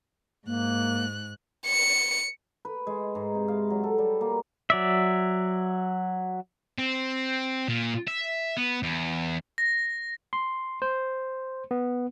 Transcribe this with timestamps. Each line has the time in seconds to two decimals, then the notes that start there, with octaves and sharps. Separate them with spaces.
0.47 G#2 A#3 F#6
1.66 C#7
2.65 B4
2.87 G#3
3.15 G#2
3.35 C3
3.48 F5
3.70 F#3
3.83 A4
3.98 G3
4.21 A#3
4.70 F#3 D5 E5
6.78 C4
7.68 A#2
8.08 E5
8.57 B3
8.83 E2
9.58 A#6
10.33 C6
10.82 C5
11.71 B3